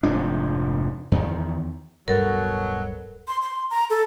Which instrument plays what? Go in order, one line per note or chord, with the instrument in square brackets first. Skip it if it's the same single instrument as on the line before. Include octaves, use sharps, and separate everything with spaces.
[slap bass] F1 G#2 F3 D4
E2 D#3
[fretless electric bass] D1 G2 [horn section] B2 F#3 [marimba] A4 A#4
[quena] C6
C6
A#5
A4